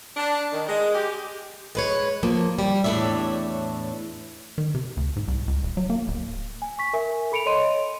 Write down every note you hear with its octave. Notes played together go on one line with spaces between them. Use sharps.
D4
D#3
G#3
G4
G#3 B4 C#5
F3 A#3
G3
E2 A2 C4 D4 C#5 E5
D#3
C3
D2
G#2
C2
C#2
D#1
F#3
A#3
D1
G#5
C#6 B6
A#4 E5 G#5
A4 B5 C#7 D7 F7
C#5 D#5 C6 D#7